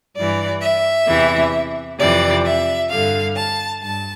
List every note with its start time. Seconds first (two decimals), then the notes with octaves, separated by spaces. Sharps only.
0.16 G2 E3 D5
0.61 E5
1.07 E2 C3 E3
1.99 F2 C3 E3 D5
2.45 E5
2.91 G2 D3 F5
3.36 A5
3.82 G2 A5